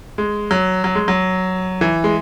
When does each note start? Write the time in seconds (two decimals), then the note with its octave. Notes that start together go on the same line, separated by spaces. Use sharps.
0.18 G#3
0.51 F#3
0.84 F#3
0.95 G#3
1.08 F#3
1.81 E3
2.04 G#3